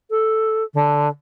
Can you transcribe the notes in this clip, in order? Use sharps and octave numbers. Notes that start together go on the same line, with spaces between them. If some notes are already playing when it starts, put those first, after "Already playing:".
A4
D3